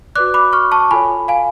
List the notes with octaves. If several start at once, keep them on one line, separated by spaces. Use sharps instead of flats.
F#4 B4 D5 D6 F#6
B5 D6
C#6 F6
A5 C#6
F4 A4 C#5 G#5 B5
F5 G#5